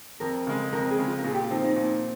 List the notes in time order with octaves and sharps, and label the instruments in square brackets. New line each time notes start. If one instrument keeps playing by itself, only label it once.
[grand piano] F2 [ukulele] A#4
[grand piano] C#3 G#3
[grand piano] F2 [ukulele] A#4
[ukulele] G#4
[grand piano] C#3 G#3
[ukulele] F4
A#4
[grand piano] A#2 [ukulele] G#4
[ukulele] G4
F4
[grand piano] F3 C4 [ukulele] D#4
[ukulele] D#4
[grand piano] A#2 [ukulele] D#4